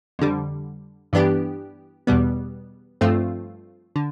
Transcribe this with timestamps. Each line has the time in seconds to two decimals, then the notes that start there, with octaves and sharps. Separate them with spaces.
0.19 F2 D3 G3
1.13 G2 E3 B3 D4 G4
2.07 E2 B2 G3 B3
3.01 G2 F3 A3 C4 F4
3.96 D3